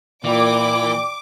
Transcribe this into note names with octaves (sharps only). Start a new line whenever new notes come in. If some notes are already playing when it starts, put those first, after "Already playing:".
A#2 E3 D5 G5 B5 D6